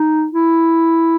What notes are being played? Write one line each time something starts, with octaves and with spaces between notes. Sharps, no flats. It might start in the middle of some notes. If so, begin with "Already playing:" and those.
Already playing: D#4
E4